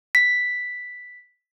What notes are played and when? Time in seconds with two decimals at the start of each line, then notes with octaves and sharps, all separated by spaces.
0.15 B6